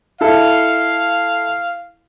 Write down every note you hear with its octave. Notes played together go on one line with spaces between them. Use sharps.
E4 A4 F5